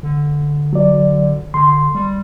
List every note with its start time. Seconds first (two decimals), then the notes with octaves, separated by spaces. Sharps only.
0.03 D3
0.73 F#3 D5
1.54 D3 C6
1.95 G3